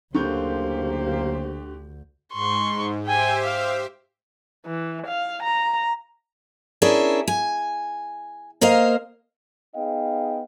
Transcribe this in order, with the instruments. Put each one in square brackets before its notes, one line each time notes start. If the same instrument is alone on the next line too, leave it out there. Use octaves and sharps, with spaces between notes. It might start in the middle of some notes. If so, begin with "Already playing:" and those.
[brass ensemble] F#1 A#3 C5 [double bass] D2 [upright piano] D3 C#6 G6 [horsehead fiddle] G4
[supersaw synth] G#2 [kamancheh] C6 C#6
[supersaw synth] G4 C5 E5 [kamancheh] G5 G#5
[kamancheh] F5
[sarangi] E3
F5
A#5
[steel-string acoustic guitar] C#4 D4 E4 G#4 A#4
G#5
A#3 A#4 C5 D#5 F5
[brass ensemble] B3 D#4 G#4 D#5 F5 G5